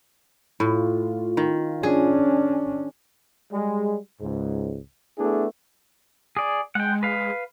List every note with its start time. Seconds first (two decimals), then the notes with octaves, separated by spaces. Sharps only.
0.60 A2 F4
1.37 D#3
1.83 C#4 D4 G#4
3.52 G3 G#3
4.21 C#2 G#2
5.18 A3 B3 D4 E4 G#4
6.37 G#4 D5
6.75 G#3 F#5 G5
7.03 B4 F5